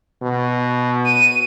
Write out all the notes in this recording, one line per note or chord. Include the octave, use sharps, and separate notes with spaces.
B2
D#7